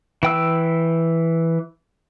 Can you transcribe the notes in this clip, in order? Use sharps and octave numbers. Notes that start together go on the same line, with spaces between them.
E3 G5 E6